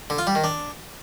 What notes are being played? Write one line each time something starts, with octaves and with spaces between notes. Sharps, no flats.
D3
F4
G3
D#3
D4